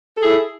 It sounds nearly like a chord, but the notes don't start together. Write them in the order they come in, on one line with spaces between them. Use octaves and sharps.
A4 G#4 E4